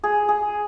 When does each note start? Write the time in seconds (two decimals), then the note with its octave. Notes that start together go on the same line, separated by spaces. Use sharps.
0.04 G#4
0.29 G#4